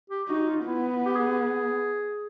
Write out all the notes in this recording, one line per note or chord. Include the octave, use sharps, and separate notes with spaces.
G4
D#4 F#4
F#4
F4
B3 E4
G4
G#4